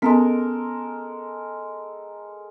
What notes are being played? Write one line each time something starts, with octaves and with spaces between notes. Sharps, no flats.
G#3 B3 C#4 A4 A#4